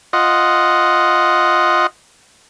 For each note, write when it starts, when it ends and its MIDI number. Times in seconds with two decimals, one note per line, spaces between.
0.13 1.87 65
0.13 1.87 75
0.13 1.87 78